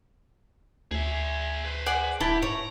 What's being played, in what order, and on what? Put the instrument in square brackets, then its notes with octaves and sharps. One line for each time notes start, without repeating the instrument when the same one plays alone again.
[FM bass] D2 [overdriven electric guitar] G#4 E5
[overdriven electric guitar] B4 C5
[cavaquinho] G#4 D5 F#5
[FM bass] D1 [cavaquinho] E4 A5 [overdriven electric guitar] G4
[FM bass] G#2 [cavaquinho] C#5 [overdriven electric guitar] A#5